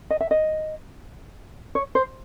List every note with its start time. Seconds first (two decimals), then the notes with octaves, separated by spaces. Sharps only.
0.10 D#5
0.20 E5
0.31 D#5
1.75 C#5
1.95 C5